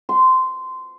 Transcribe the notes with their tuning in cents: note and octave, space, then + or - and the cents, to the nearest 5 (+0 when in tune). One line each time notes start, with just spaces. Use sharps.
C6 -15